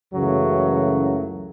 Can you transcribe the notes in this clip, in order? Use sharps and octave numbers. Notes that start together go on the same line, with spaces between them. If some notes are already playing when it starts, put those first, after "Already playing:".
C#2 F#2 C#3 E3 F#3 A3